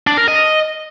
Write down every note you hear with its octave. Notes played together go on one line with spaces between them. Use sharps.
D4
A#4
D#5